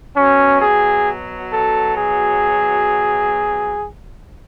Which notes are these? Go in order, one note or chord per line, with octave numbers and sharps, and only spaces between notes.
B2 F#3 C#4
G#4
A4
G#4